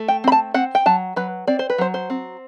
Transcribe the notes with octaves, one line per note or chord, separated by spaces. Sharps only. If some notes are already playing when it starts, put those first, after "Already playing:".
Already playing: A3
G5
C4 B5
A5
C4 F#5
G5
F#3 A5
F#3 B4
C4 D5
C5
B4
F#3 C5
C5
C4